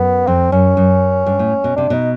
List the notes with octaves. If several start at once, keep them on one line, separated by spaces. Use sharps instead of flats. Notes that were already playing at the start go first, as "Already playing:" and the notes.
Already playing: F#2 B3
F2 C4
F#2 C#4
F#2
G2
A2
B2
C3 D4
B2 D#4